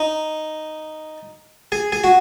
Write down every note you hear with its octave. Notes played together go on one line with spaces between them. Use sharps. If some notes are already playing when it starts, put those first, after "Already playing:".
Already playing: D#4
G#4
G#4
F#4